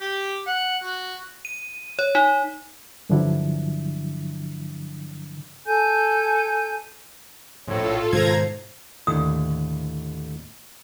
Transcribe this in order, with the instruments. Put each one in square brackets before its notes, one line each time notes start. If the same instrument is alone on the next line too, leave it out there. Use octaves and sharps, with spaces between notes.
[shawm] G4
F#5
F#4
[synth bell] D#7
C#5
D#4
[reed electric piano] G2 D3 F3 F#3 D4 E4
[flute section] A4 G#5 G6
[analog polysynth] A#1 A2 [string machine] F4 A4 [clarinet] C#5
[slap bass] G#2 B2 D#3 [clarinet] C5 [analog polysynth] A#5 G#6
[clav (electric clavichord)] D#2 A2 D3 [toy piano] D#6